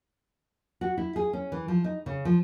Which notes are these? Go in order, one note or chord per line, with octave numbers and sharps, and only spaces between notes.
F#4
E4
G#4
C#4
E3
F3
D#4
C#3
F3